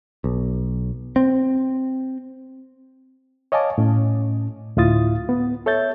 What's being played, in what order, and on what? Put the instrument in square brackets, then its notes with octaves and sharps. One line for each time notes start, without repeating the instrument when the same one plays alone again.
[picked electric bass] B1
C4
[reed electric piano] C#5 D#5 F5 G#5 A5 D6
A2 C#4
D2 A2 E4 F4 D#6 A6
B3
A4 C#5 E5 G6 A6